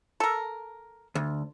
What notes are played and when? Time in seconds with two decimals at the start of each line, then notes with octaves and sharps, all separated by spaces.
0.20 A4 A#4
1.15 D2